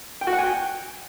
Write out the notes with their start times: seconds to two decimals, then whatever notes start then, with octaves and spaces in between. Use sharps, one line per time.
0.21 G5
0.27 F#4
0.33 F#5
0.38 G#5
0.44 G5